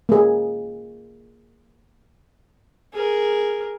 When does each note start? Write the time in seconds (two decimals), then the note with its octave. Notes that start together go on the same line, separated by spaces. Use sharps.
0.09 A#3 G#4
2.93 G#4 A#4